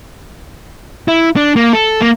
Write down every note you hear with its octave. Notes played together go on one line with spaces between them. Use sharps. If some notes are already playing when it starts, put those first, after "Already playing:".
E4
D4
A#3
A4
A#3